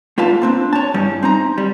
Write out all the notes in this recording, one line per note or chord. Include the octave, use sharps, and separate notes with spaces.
A3 F4 B4 F5 A5
A#3 C4 D4
C#5 A5
G2 G3 C#4 E4
C4 D#4 A#5
G3